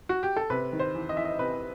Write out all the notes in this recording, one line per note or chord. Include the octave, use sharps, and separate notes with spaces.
F#4
G4
A4
C3 B4
D#3
C5
E2
D#5
E2 E5
D#5
C3 B4